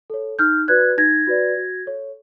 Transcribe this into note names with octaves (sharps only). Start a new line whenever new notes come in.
A4 C#5
D#4 F6 G6
F#4 B4 D5 F#6 G#6
D#4 G#6 A#6
F#4 B4 D5
F#4
A4 C#5